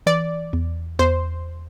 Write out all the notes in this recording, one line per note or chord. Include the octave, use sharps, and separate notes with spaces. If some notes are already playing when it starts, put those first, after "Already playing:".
E3 D5
E2
E2 C5